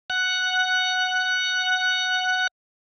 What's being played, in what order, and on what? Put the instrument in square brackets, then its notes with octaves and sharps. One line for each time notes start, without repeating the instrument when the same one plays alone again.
[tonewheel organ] F#5 F#6